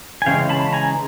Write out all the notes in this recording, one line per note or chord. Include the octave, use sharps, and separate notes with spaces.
G#5
C#3 E3 G#3 C#4 F5 G5
A5 B5
G#5 A#5